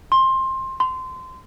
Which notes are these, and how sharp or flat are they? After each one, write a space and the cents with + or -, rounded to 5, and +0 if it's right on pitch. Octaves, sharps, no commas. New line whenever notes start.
C6 +20
C6 -20